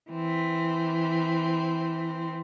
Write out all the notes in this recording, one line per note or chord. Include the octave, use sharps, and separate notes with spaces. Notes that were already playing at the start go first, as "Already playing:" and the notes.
E3 C4